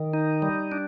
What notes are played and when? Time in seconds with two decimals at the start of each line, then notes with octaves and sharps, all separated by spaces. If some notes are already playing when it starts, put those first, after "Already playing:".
Already playing: D#3
0.13 D#4
0.42 G3
0.72 D4